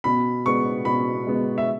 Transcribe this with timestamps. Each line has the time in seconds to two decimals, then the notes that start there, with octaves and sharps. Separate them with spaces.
0.04 B2 B5
0.45 G#3 B3 C#6
0.85 B2 B5
1.27 G#3 B3
1.58 E5